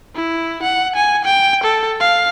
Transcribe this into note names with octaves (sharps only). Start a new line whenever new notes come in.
E4
F#5
G#5
G5
A4
F5